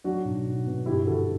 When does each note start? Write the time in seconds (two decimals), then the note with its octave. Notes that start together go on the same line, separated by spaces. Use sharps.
0.04 F#3 D4 F#4
0.25 B1
0.46 B1
0.66 B2
0.86 G1 E4 G4
1.06 D3 F#4 A4